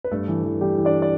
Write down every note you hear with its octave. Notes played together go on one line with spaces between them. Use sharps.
B4
G2 A3 A4
E3
E3
E3 G3 G4
E3
D4 D5
D5